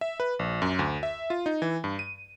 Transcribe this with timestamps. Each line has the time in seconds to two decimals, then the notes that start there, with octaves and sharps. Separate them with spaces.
0.01 E5
0.20 B4
0.39 A#1
0.62 F#2
0.79 D2
1.03 E5
1.30 F4
1.46 D#4
1.62 E3
1.84 G2
1.99 D#7